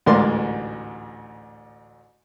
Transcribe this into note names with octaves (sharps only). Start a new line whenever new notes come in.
A1 D2 G#2 A#4 D5 C6